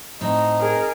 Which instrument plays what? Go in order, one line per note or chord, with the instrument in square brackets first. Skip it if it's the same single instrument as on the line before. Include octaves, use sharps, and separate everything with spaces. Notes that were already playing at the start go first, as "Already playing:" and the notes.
[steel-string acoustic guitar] A2 C4 [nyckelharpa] D#4
[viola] G#4 A#4